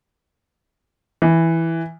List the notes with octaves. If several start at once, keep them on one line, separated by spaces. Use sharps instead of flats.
E3